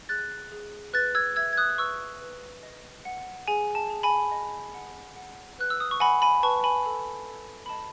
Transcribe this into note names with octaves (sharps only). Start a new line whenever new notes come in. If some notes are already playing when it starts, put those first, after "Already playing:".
G#4 F#6 A6
G#4
B4 F#6 A6
E6 G#6
E5 E6 G#6
G#6
D#6 F#6
B4 C#6 E6
B4
D#5
F#5
G#4 G#5
A5
G#4
G#5 B5
D#5
F#5
F#5
B4 F#6
E6
D#6
C#6
F#5 G#5 B5
G#5 B5
B4 A5 C#6
G#5 B5
A4
A4
B5
D#5 A5